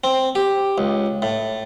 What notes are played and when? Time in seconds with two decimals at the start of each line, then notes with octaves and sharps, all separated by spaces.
0.04 C4
0.35 G4
0.78 C#2
1.22 A2